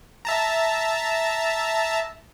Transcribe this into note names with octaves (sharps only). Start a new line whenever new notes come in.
E5 A5 A#5